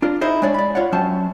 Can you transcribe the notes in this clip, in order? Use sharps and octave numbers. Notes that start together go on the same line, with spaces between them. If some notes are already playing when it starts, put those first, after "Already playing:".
D4 F4 A#4 D5
D#4 E4 G#4 C5 D#5
G#3 D4 C#5 D5
D5 B5
F4 C#5 D5 F#5
F#2 F#3 C#4 C5 G5 A5